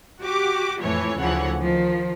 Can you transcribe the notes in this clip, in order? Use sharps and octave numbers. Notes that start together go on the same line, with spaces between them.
F#4 G4 D6
F2 A2 E3 C#5
D2 C#3 E3 F3 C#5 F#5
D#3 F3